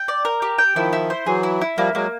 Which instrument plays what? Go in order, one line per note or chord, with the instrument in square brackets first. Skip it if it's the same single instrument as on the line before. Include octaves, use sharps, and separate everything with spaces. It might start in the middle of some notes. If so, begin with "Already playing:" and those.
Already playing: [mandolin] G5
D5
A#4
G4
G5
[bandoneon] D#3 F3 [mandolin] E4
[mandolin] E4
C5
[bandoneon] E3 F#3 [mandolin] G#4
[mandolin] E4
E4
[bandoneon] F3 G3 [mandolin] A#3
[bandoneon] F#3 G#3 [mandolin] A#3